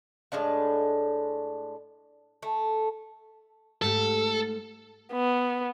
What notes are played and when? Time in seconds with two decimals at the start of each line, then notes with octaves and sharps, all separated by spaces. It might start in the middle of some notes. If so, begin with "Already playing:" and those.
0.32 A2 G#3 D4 F5
2.42 A3
3.82 G#2 A3 G4 A4
5.13 B3